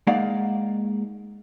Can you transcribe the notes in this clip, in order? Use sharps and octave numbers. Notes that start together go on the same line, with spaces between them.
G#3 A#3 D#4 D5 F5 F#5